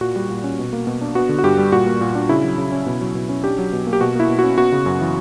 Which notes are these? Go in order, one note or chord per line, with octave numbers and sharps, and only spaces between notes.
A#2 F#4
G3
A#2
C#4
B2
A#3
B2
D4
B3 F#4
D3
F#4
G2 G4
G3
A#2 F#4
A#3
A#2
D4
C#3 E4
F#3
C#3
C#4
B2
F#3
B2
C#4
D4 G4
F#3
B2
A#3
G4
B2 F#4
A#3 E4
B2
C#4 F#4
B3 F#4
C#3
F#2
E3